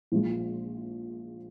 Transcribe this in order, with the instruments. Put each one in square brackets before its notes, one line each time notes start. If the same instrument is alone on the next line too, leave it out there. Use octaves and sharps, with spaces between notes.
[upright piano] A#1 A#2 F3 G#3